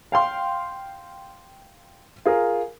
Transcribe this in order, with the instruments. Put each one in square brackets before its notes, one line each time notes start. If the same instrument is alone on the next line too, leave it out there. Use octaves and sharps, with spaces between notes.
[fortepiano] F5 G5 C6
[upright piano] F4 G#4 A#4